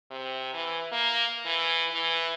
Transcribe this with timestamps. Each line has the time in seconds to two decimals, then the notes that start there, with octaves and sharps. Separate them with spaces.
0.11 C3
0.53 E3
0.92 A#3
1.46 E3
1.92 E3